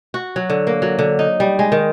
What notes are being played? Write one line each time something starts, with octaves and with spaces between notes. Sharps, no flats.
F#4
F#3
D3
A#3
F#3
D3
D#4
G3
G#3
D#3